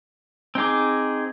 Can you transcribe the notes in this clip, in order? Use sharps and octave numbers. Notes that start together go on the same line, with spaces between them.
C4 D#4 G#4 D6